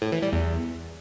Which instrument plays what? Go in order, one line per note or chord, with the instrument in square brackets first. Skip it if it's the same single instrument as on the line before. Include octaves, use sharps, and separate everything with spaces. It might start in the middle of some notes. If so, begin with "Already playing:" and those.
[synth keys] A2
E3
G3
E2